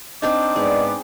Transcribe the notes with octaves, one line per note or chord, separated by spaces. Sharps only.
C4 D4 D#4 D#5 D6
G#2 B3 G#4 D5